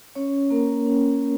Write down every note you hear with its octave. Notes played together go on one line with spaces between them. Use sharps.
C#4 C#5
A#3 A#4
C#4